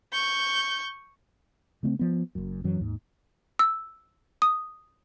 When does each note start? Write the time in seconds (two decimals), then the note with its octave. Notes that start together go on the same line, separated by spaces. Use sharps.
0.13 C#6 G6
1.83 C#3 A3 A#3 C4
1.99 F3 B3
2.35 F#1 F#2
2.64 F#2 E3 F#3
2.80 D#2 G#2
3.59 E6
4.42 D#6